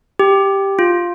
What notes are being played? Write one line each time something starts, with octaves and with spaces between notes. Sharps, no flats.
G4
F4